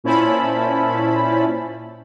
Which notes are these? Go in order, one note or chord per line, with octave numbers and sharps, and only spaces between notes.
A#2 C#4 E4 C5 A5 B5